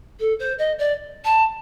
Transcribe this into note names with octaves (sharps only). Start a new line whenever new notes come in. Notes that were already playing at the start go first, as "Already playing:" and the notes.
A4
C5
D#5
D5
A5